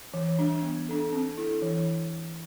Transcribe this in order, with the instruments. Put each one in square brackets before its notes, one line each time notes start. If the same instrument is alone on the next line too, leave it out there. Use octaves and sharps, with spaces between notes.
[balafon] E3
G3 D4
B3
D4 A4
C4
E4 A4
E3